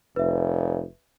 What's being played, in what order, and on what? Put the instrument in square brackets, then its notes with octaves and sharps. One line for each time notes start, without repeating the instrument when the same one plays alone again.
[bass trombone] F1 [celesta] B4 E5